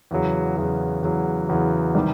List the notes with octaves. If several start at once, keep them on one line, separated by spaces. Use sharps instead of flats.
E2 C#3 F#3
E2 C#3 F#3
E2 C#3 F#3
E2 C#3 F#3
C3 D#3 G3